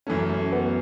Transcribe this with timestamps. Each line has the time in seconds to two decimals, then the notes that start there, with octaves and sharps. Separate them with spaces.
0.07 F#2 E3 A3 C#4
0.29 A3
0.53 B3